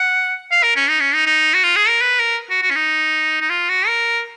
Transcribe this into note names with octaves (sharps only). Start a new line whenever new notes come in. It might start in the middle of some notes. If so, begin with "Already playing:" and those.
Already playing: F#5
F5
A#4
C#4
D#4
C#4
D#4
D#4
F#4
F4
G#4
A#4
B4
A#4
F#4
F#4
C#4
D#4
D#4
F4
F#4
A#4